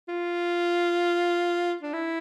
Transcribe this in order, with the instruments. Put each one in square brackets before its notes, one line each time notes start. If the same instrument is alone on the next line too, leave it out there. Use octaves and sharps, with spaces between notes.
[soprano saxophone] F4
D4
E4